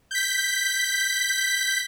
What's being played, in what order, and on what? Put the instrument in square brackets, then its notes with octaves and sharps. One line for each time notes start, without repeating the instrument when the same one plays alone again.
[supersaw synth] G6 B6